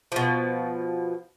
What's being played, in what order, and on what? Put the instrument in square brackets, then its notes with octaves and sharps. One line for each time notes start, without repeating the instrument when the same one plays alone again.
[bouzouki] B2 F3